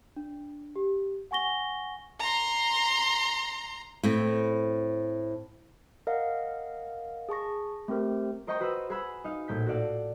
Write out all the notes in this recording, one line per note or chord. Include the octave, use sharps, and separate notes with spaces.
D4
G4
F#5 G#5 C#6 A#6 G7
A#5 C6
A2 C4
A#4 D#5 F5 F#5
G#4 A5 C#6 A#6
A3 C4 G4 A#4 C5
A#4 C5 D#5 G5 A#5 C#6
F#4 B4 C5 C#6 E6
G#4 B4 F#5 B5 E6
D#4 F5
A#1 A2 A#3 G6 B6
F#4 A4 D5 F5